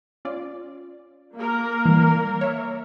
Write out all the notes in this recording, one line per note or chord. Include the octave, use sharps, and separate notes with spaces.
C#4 F4 D5
A#3 A#4
E3 G3
C#5 E5